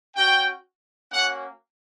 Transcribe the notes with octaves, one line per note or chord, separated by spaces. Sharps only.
C#4 F#4 G5
A#3 C#4 F#4 F#5